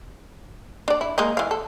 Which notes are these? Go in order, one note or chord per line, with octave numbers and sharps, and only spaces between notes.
D4 D5
E4
G#3 A#3 D#4
E3 F5
A4